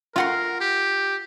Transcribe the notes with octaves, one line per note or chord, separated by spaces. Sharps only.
F4 A#4 F#5 C6
G4